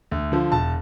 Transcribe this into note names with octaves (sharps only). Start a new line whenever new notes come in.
D2
D3 F3
E1 A5